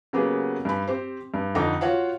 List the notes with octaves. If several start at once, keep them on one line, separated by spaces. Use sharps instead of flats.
C#3 F#3 A#3 B3 G4 G#4
G2 B5
C4 G4 C5
G2
F2 D3 D#4 G5 A#5
F4 F#4 C#5 F5 F#5